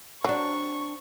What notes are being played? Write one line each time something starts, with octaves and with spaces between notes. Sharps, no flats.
F#3 C4 D4 C#6